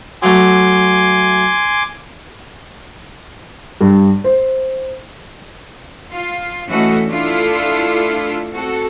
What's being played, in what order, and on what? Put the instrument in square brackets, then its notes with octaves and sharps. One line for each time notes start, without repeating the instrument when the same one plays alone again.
[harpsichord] F#3 A3 [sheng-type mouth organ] G#5 C6 D6
[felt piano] G2
C5
[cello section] F4
E3 A3 C#4 F#4 A4 D#5
A3 D4 E4 F4 A4
C4 F#4 A4